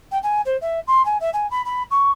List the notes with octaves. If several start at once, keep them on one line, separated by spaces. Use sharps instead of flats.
G5
G#5
C5
E5
C6
G#5
E5
G#5
B5
B5
C#6